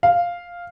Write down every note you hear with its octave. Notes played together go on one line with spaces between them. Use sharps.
F5